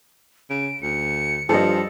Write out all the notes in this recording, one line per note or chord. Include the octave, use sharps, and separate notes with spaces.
C#3 D7
D2 C#7
G2 F3 A4 D#5 C#7